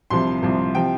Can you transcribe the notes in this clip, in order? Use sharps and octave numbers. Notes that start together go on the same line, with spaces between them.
C2 C3 F3 C6
C2 C3 F3
C3 F3 G5